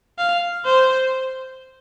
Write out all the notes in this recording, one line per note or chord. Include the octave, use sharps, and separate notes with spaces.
F5
C5